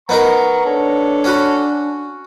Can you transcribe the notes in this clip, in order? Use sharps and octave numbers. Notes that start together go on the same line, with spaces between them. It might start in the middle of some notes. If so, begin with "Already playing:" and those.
B3 D#4 A#4 A#5 C#6
D4 A4 C#5
C#4 F#4 B5